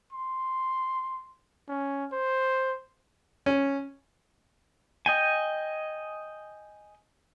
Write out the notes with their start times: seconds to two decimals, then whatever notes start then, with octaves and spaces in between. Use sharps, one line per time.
0.12 C6
1.68 C#4
2.12 C5
3.46 C#4
5.06 D#5 G5 G#5